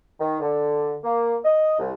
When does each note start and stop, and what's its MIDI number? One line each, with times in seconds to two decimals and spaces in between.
0.20 0.37 51
0.40 0.96 50
1.03 1.36 58
1.44 1.77 75
1.79 1.92 36